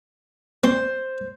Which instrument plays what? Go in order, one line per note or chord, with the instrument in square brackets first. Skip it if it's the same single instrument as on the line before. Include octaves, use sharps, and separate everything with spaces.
[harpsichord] C4 [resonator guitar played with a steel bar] C5